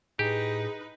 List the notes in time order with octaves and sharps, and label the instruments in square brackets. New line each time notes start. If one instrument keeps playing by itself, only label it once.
[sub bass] A2 [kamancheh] D#4 B4 [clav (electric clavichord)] G4 [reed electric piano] G#4